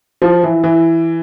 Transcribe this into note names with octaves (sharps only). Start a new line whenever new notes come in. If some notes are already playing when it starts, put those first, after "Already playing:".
F3
E3
E3